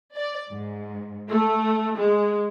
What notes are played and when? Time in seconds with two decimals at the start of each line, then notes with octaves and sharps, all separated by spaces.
0.15 D5
0.51 G#2
1.28 A3
1.96 G#3